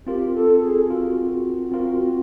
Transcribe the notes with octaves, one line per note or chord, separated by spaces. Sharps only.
C4 F4 G4 A#4
A4
G#4
C4 F4 F#4 A#4
C4 F4 A#4